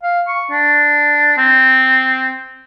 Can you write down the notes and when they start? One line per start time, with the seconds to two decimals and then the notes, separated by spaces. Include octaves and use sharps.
0.03 F5
0.27 C#6
0.51 D4
1.38 C4